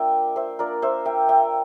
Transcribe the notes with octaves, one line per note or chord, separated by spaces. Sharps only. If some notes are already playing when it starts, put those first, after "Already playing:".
Already playing: A#3 D4 F4 D5 E5 G5
C5 E5
A#3 D4 F4 A#4 D5
C5 E5
E5 G5
E5 G5